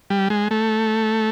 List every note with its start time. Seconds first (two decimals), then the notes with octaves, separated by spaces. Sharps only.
0.10 G3
0.30 G#3
0.51 A3